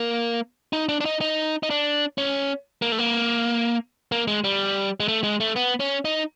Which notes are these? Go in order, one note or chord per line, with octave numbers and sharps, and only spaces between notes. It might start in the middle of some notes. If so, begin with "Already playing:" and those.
Already playing: A#3
D#4
D4
D4
D#4
D#4
D#4
D4
C#4
A#3
A3
A#3
A#3
G#3
G3
G#3
A3
G#3
A3
B3
C#4
D#4